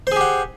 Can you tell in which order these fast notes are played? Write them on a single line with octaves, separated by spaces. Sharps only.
C5 G#4 G4 F#5